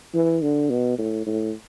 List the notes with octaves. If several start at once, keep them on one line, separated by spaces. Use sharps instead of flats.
E3
D3
B2
A2
A2